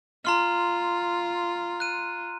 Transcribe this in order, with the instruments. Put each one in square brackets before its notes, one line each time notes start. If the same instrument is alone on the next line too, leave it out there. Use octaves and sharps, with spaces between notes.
[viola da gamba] F4 [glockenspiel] A#5 C6 F6
[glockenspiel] F#6 D#7